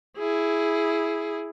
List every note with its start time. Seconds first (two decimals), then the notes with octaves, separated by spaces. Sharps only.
0.18 E4 G#4